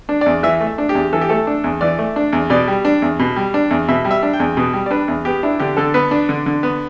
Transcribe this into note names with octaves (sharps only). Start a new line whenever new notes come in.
D4
E2 D5
E3 E5
A3
E5
D4
G4
E2
E3 A4
G4
A3 A4
D4
E2
E3 D5
A3
D4
E2
B2 D5
G3
D4
E2
B2
G3
D4
E2
B2 E5
G3
E5
D4
G5
E2
B2
G3
D5
D4 B4
E2
B3 G4
D4 E4
D3 G4
D3 A4
B3 B4
D4
D3
D3
B3